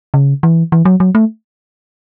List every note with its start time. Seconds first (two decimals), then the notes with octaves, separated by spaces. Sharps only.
0.14 C#3
0.43 E3
0.72 E3
0.85 F#3
1.00 F#3
1.15 A3